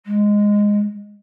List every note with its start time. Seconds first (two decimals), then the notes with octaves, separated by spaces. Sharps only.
0.06 G#3